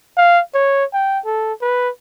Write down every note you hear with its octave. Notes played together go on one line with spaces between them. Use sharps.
F5
C#5
G5
A4
B4